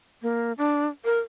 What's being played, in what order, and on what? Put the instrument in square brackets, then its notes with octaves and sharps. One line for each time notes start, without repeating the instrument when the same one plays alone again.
[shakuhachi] A#3
D4
A#4